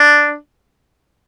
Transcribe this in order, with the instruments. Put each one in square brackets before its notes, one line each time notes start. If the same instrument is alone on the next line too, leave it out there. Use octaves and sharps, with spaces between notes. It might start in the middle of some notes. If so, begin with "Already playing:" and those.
Already playing: [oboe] D4